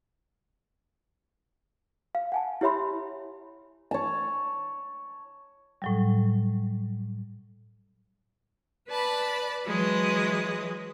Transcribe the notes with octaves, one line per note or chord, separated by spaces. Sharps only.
F5
F#5 G#5 A5
E4 G4 C#5 E5 B5 C6
C#5 A5
A2 F#3 G3
B4 D5 A5 B5
E3 F#3 G#3 B4 D#5